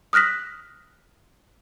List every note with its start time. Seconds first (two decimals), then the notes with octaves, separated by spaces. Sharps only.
0.13 D#6 F6 F#6 A#6 B6